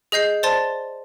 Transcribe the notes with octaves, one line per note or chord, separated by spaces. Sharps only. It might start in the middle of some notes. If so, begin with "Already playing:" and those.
G#4 D#5 G6 C7
C5 D5 A5 C6 A6